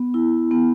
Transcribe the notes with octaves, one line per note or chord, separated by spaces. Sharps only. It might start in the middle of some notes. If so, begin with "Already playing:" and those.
Already playing: B3
E4
B3